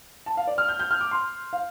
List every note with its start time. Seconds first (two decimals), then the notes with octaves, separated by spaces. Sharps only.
0.26 A5
0.37 F5
0.47 D5
0.58 F6
0.68 G6
0.79 G6
0.91 F6
1.01 D6
1.11 C6
1.53 F5